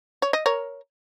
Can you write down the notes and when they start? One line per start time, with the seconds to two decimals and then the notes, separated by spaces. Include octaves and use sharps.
0.22 C#5
0.33 D#5
0.46 A#4 C#5